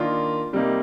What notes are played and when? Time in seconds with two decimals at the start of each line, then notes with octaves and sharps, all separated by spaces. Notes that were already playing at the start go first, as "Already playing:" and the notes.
Already playing: D#3 A#3 D4 F4
0.53 C3 G3 A#3 D#4